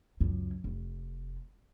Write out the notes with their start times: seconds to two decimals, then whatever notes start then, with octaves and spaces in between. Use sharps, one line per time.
0.21 C#2 F#2
0.64 F1